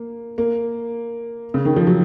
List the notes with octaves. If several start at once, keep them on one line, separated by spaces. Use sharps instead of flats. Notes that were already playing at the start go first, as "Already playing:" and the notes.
Already playing: A#3
A#3
C#3
D#3
F3
F#3